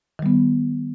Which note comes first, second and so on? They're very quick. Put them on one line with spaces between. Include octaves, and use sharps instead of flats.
D#3 G3 B3